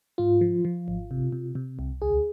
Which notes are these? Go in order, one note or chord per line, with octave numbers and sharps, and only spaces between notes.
G#2 F4
F3
F3
G#1
C3
C3
C3
C2
D2 G#4